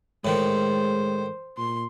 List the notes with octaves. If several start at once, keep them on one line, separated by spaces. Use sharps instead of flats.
A2 D#3 G#3 C5
A#2 C6